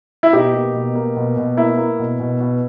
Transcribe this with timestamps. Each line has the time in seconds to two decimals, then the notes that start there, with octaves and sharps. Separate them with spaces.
0.23 E4
0.33 B2 D#4 G4
0.54 A#3
0.74 B2
0.95 A#3
1.16 B2
1.37 B2
1.57 A#3 E4
1.77 A#3
1.99 B2
2.20 B2
2.40 B2